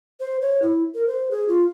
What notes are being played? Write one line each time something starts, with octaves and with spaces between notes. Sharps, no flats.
C5
C#5
E4
A#4
C5
G#4
F4